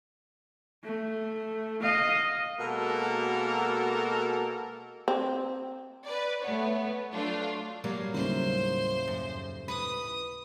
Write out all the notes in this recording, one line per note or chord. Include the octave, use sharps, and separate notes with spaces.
A3
D#5 F5
B2 G#3 A#3 F#4 A4 A#4
C4
B4 D5
A3 B3 C#5
F#3 A3 D4 F4
F#3 G3 A#3
D#2 A2 C#3 C5
F#2
B4 D#6